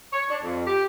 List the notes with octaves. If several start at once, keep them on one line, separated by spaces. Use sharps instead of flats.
C#5
D4
F2
G4